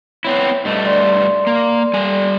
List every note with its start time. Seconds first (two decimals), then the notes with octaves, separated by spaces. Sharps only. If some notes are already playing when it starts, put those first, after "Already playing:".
0.25 B3 C4 E4 C#5
0.65 G2 A3 D#5
0.85 D5 C6
1.47 A#3
1.94 G3 G#5